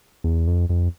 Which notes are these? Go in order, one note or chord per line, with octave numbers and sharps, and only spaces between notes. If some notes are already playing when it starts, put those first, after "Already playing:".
E2
F2
F2